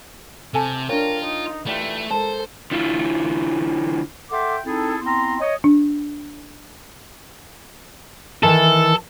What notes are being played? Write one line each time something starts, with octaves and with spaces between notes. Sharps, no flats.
C3 A4 G#5 A5
D4 F4 A#4 C#5 G5
D#4
E3 A3 F4 G4 D5
G#3 A4 A#4 C5 A5
D3 E4 F4
A4 E5 F#5 G5 C6 D6
C4 D#4 E4 G#4 A4
B3 C4 E4 A#5 C6
C#5 D#5
D4
D#3 E3 A4